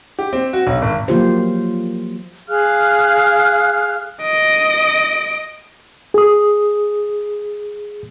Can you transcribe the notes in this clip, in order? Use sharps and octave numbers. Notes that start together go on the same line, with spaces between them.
G4
C4
F#4
B1
G#1
F3 F#3 A#3 F4 G4 C5
G#4 F5 F6 F#6
D#5 D7
G#4 D#6